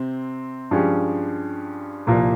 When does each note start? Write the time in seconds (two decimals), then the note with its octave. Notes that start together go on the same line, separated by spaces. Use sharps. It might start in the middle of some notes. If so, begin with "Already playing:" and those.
Already playing: C3 C4
0.71 G2 F3 G#3 C#4 G4
2.07 C2 A#2 F3 A#3